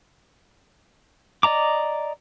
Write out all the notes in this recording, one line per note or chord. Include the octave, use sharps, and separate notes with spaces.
D5 D#5 A#5 D6